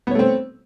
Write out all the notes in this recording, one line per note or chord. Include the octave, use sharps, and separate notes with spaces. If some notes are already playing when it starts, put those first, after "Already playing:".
A3 B3 C4 C#5